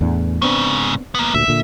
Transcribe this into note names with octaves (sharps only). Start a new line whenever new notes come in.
E2 A2 D4
G#2 C#3 B3 C4 D4
A#3 B3
D2 A#2 E5
A#2 D3